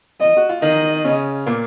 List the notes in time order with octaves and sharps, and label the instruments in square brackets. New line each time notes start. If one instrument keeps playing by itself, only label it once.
[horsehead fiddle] D#5
[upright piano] F#4
F4
[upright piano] D#3 D#4 [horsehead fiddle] D#5
[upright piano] C#3 C#4
A#2 A#3